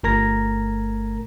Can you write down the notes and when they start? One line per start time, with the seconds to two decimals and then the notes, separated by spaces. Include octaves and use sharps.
0.03 G1 A3 A#4 A#5 G#6 A#6